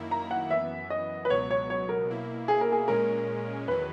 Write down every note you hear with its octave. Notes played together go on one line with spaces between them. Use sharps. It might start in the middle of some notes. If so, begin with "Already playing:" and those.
Already playing: F#2 D#3 A#3 E4
A#5
F#5
F#2 E3 B3 E5
D#5
B4
C#2 B2 F#3 B3 C#5
C#5
C#5
A#4
B2 A#3 E4
G#4
A#4
G#4
A#2 G#3 C#4 A#4
E2 D#3 F#3 B4